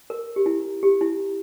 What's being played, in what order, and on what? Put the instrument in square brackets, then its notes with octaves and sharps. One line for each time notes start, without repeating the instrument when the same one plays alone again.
[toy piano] A#4
G4
E4
G4
E4